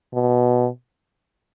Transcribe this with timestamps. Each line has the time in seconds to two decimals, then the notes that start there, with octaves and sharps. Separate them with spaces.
0.14 B2